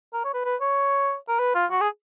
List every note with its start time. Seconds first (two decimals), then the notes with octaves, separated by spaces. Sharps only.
0.13 A#4
0.24 C#5
0.34 B4
0.45 B4
0.61 C#5
1.28 A#4
1.39 B4
1.55 F4
1.71 F#4
1.81 G#4